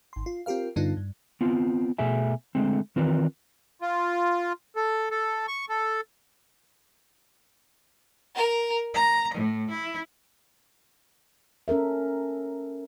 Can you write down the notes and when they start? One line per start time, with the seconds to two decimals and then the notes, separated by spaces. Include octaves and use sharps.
0.13 G#1 C6
0.26 F4
0.46 C4 F4 G4 A#4 F5
0.76 G2 D3 B3 D4 D#4 F4
0.97 G2
1.41 B3 C4 F4
1.98 B2 A3 G#4 E5 G#5
2.55 D3 G#3 A3 C4
2.96 D#3 E3 C4 F4 A#4 B4
3.82 F4
4.76 A4
5.11 A4
5.48 C#6
5.69 A4
8.35 A#4
8.94 A#5
9.33 A2
9.69 E4
11.68 C#4 A4 A#4 E5